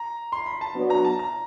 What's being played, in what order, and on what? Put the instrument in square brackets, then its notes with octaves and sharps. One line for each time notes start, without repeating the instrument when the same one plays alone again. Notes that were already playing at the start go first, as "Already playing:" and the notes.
Already playing: [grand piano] A#5
C6
B5
A5
[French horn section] F#3 B3 D4
[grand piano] A#5
A5
A#5